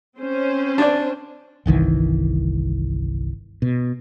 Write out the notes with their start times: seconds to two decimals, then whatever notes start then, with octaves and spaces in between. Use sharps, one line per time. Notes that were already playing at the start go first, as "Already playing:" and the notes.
0.16 C4 C#4 C5
0.78 D4 D5
1.66 G1 C2 D#3 E3
3.62 B2